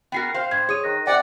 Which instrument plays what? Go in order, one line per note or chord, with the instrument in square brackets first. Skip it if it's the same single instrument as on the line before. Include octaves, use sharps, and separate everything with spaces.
[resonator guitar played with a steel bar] B3 F#4 A#4 [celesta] G5 C7
[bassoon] C5 [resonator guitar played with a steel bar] F5
[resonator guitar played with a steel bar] G2 [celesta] G#6
[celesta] G#4 D#6 D#7 [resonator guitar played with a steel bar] C#5
[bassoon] D#3 [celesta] F#6 A#6
[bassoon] C3 [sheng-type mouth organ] D5 F#5 [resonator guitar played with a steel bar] G5